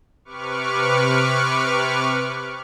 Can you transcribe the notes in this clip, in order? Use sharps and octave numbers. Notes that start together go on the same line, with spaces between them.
C3 B4 C#6 D6 F6